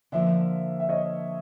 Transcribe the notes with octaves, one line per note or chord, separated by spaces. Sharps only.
D3 F3 A#3 D5 E5
E5
C#5 D#5